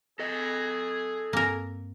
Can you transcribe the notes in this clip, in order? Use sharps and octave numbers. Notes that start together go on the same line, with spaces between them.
G#4 A4 D#5
G2 A#3 C4 A#4 G#5